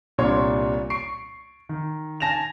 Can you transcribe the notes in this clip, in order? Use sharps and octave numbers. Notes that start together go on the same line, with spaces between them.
C2 A#2 G3 D4 C#5 C6
C#6 C7 D7
D#3
G#5 A5 A#6 E7 F7